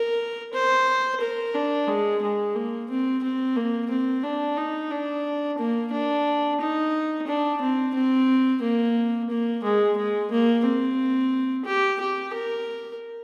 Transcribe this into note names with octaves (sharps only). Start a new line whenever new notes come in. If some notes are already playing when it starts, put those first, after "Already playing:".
Already playing: A#4
C5
A#4
D4
G#3
G#3
A#3
C4
C4
A#3
C4
D4
D#4
D4
A#3
D4
D#4
D4
C4
C4
A#3
A#3
G#3
G#3
A#3
C4
G4
G4
A#4